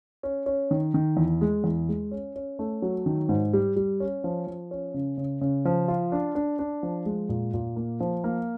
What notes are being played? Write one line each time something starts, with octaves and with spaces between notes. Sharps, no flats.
C#4
C#4
D#3
D#3
E2
G#3
E2
G#3
C#4
C#4
A3
F#3
D#3
G#2
G3
G3
C#4
F3
F3
C#4
C#3
C#3
C#3
F3
F4
D4
D4
D4
F3
G#3
A#2
A#2
A#3
F3
A#3